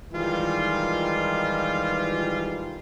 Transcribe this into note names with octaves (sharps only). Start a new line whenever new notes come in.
D#3 E3 G3 G#3 F4